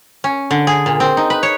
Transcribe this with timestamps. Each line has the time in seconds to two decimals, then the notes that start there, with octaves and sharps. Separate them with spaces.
0.24 C#4
0.51 D3
0.67 G#4
0.86 A#2
1.00 C4
1.17 D#4
1.30 B4
1.43 C#5